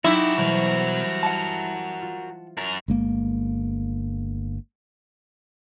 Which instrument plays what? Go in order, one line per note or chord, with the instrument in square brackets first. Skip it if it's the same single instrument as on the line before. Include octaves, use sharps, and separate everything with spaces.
[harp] F#3 C6 B6 [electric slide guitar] D#4 [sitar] E4 [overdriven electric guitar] F#4 G4
[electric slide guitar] B2 [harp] E3 G3 C5 [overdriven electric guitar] F#4 A#4
[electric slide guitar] F#5 A5
[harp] F4
[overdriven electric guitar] F#2 A#4
[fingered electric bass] G1 G#3 A#3